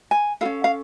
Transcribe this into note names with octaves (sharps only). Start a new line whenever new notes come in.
G#5
C#4 F4 A4 F5
F5